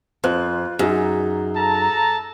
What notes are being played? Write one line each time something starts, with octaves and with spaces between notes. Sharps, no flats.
F2 F4 C5 F#6
F#2 D#4 G#4
A4 A5 A#5